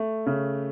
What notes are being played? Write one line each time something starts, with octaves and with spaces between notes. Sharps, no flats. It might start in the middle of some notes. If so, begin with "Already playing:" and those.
Already playing: A3
C#3